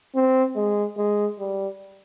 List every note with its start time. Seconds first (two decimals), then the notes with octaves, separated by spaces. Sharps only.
0.15 C4
0.56 G#3
0.97 G#3
1.39 G3